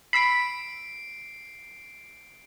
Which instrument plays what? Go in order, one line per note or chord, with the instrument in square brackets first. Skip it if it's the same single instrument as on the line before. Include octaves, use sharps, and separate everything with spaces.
[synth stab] B5 E6 B6 [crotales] C7 D7